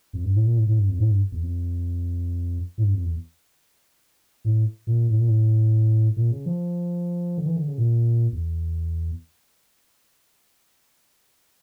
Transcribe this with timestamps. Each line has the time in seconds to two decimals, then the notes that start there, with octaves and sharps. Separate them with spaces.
0.13 F2
0.24 G2
0.35 A2
0.46 A#2
0.57 A2
0.67 A2
0.79 G2
0.88 F2
0.99 A2
1.10 G2
1.32 E2
1.42 F2
2.78 A2
2.83 G2
2.93 F2
3.05 E2
4.45 A2
4.87 A#2
5.09 A2
5.19 A#2
5.28 A2
6.16 A#2
6.31 C#3
6.46 F3
7.38 D3
7.46 E3
7.56 D3
7.67 C#3
7.78 A#2
8.33 E2